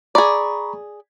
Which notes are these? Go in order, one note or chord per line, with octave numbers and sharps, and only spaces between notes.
G#4 D5 A#5 B5 C#6